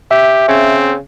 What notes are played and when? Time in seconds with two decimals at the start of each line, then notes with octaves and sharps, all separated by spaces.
0.11 G4 E5
0.48 C#3 C4